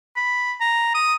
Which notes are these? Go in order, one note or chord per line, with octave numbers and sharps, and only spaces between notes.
B5
A#5
D#6